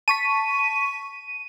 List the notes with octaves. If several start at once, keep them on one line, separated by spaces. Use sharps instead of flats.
A5 C#6 B6 D#7